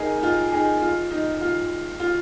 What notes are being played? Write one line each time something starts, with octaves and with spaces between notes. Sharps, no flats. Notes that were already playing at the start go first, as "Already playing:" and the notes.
Already playing: D#4 G#4 A#4 D#5
D#4
F4
D#4 G#4
F4
D#4
F4
F4